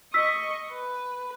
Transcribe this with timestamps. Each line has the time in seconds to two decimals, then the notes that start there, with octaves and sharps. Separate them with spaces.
0.14 D#5 C#6 E6 B6
0.71 B4